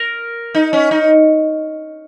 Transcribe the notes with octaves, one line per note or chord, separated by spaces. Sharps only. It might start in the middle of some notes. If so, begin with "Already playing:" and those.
Already playing: A#4
D#4
C#4
D#4